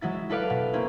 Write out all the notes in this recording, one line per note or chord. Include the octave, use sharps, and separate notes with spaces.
F#3 G#3 E4 A6
E4 A4 B4 D5 F5
B2
A#3 C4 C#4 E4